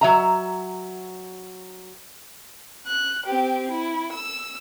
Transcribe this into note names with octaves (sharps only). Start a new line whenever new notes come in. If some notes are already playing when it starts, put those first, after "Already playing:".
F#3 E5 A#5
F#6
C4 G4
E4
E6